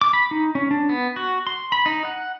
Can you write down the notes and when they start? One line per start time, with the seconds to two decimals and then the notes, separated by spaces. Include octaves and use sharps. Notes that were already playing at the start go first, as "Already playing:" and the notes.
0.01 D6
0.13 B5
0.31 D#4
0.55 C#4
0.71 D4
0.89 B3
1.16 F#4
1.47 C6
1.72 B5
1.86 D#4
2.05 F#5